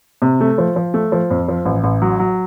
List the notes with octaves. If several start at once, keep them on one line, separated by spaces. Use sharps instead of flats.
C3
A3
F3
F3
A3
F3
F2
F3
A1
A1
F#3
F#3